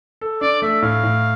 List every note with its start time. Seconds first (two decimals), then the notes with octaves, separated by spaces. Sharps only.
0.21 A4
0.41 D4 D5
0.62 A3 E5
0.82 A2 F5
1.03 A2